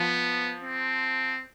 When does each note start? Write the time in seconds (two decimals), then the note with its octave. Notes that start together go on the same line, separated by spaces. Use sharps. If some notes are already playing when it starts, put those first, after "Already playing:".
Already playing: F3 B3
0.63 C4